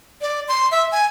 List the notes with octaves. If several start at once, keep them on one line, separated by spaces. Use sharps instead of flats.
D5
C6
E5
G#5